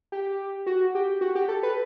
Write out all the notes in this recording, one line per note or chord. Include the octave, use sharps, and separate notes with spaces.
G4
F#4
G4
F#4
G4
A4
B4